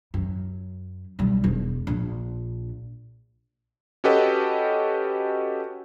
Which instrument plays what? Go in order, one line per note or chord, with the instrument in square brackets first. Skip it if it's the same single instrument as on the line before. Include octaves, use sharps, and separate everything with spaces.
[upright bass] F#2
B1 G3
E1
A#1 D4
[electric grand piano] C#4 F#4 G4 A4 B4 D#5